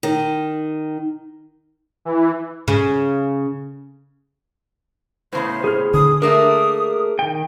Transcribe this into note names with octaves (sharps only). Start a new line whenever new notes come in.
D#3
E3
C#3
A2 C#3 B3 C5
G#4 F6
D3 D#6
A3 A#3 D4 G#4 A#4 D#6
D#3 G5